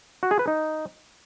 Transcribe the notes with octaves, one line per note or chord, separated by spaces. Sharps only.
F#4
G#4
B4
D#4